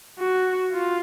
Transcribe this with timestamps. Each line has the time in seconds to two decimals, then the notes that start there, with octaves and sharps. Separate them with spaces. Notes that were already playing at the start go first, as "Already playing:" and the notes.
0.19 F#4
0.72 F4